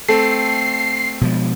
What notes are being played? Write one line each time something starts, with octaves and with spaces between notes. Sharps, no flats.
A3 C4 A4 C7
B2 F3 G#3